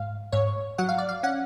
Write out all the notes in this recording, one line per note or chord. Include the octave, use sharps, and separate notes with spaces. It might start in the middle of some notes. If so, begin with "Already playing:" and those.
Already playing: G#2 F5
G#2 C#5
F#3 F#5
F5
D5
F5
C#4 F#5